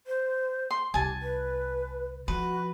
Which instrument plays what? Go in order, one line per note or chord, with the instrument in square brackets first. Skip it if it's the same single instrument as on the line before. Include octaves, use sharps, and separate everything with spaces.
[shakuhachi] C5
[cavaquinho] C6
[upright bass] C2 [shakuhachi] G4 [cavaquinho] G#5 A5
[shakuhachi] B4
[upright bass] F3 [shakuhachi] F#4 [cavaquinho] B4